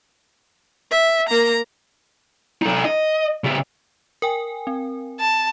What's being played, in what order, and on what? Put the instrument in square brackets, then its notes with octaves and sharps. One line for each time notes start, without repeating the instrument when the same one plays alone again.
[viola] E5
A#3 A#5
[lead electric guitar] D#4 A4
D#5
C#3 G4
[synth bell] A#4 G5 G#5
C4
[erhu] A5